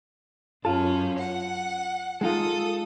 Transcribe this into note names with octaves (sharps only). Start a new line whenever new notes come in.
F#2 C#4 F4 A4
F#5
G#3 D#4 F4 A4 D#6